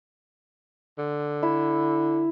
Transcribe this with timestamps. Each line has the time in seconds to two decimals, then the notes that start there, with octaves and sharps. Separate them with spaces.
0.98 D3
1.43 E4